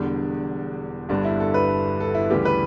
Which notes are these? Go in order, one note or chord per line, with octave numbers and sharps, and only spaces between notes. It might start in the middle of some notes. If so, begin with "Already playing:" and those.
Already playing: E1 E2 D3 G3 D4
G1 G2 D3 G3 D4
E4
A4
B4
A4
E4
D2 C#3 E3 G3 G4
B4